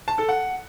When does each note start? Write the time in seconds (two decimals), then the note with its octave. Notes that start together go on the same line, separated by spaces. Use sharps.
0.08 A5
0.18 A4
0.29 F#5